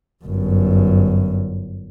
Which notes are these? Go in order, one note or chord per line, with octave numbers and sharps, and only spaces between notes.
G1 F#2